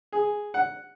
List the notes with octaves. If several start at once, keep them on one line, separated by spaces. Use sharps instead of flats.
G#4
F#5